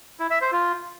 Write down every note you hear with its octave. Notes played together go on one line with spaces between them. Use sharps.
E4
E5
C5
F4